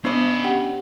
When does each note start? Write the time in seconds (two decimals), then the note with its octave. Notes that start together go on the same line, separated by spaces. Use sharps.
0.05 B3 C#4 D4 C5 D#5 B5
0.44 G4 F#5 G5